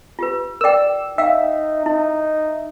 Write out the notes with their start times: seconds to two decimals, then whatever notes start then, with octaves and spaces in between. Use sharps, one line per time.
0.19 F4 G4 B4
0.61 A#4 D5 G5 E6
1.18 D#4 E5 F5 G5
1.86 D#4 E4